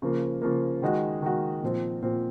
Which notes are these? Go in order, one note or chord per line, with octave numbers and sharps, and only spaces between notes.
C#3 F3 A#3
C#3 F3 A#3
D#3 G#3 D#4 F#4
D#3 G#3 D#4 F#4
A#2 F3 C4
A#2 F3 C4